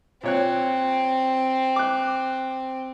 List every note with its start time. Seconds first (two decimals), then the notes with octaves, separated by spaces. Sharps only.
0.23 A#2 C4 C#5 F#6
1.76 D6 F#6